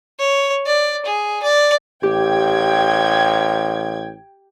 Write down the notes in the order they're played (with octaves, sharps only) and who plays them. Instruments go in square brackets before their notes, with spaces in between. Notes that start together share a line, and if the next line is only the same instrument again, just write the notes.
[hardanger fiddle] C#5
D5
G#4
D5
[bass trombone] A1 [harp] G4 [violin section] G5 G#6